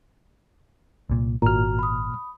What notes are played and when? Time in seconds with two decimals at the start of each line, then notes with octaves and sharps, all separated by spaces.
1.09 C2 A#2
1.42 G#1 A#2 F#4 A#5 F6
1.79 B5 D#6